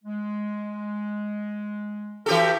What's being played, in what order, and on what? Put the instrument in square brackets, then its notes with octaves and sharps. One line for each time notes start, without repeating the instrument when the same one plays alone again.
[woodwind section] G#3
[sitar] E3 G4 A4 [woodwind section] F#4 A#4